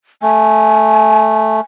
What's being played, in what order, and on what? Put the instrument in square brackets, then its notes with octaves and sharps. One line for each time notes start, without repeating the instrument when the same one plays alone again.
[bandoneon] A3 [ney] G#5